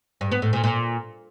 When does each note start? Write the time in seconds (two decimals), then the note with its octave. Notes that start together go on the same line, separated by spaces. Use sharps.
0.21 G2
0.32 B3
0.42 A2
0.53 A#2
0.64 A#2